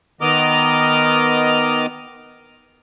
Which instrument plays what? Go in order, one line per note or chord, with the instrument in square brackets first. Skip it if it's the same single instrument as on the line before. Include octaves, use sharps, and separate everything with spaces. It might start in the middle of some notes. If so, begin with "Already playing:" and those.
[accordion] D#3 B3 D#5 A#5 D6 F6